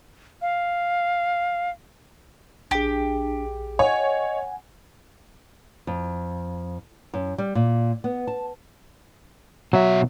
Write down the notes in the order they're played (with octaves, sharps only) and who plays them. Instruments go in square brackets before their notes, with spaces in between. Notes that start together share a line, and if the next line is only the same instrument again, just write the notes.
[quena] F5
[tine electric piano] A#1 G#4 [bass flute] D4 [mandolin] G4
[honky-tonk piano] C#5 [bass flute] D#5 [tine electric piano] F#5 G#5
[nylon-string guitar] F2
F#2
G3
A#2
B3
A5
[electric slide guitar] B2 E5 [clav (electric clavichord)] F#3